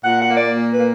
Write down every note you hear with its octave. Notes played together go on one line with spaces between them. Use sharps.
A#2 F#5
F#5
A#3
D5
A#2
B4
A#3